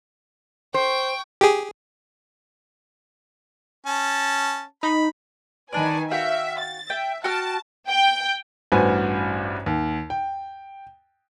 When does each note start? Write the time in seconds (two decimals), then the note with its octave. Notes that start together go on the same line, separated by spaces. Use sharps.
0.74 C5 G5 C#6
1.41 G4 G#4
3.86 C#4 A5
4.83 D#4 B5
5.73 D#3 D4 B4 D5 G#5
6.11 F#4 E5 F5 G5
6.60 A6
6.90 E5 G5
7.24 F#4 G5 A5 F6
7.88 G5
8.72 A1 G2 F#4 B4 C5 G#5
9.66 D#2
10.10 G5